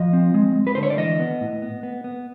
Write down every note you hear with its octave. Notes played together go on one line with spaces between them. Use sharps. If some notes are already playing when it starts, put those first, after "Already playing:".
Already playing: F3 D#5
C4
G#3
G#3
B4
D3 C5
C#5
D5
E3 D#5
B3
A2
B3
B3
B3